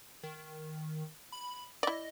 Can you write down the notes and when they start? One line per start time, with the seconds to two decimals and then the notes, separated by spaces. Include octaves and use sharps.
0.23 D#3
1.32 B5
1.83 E4 D5 D#5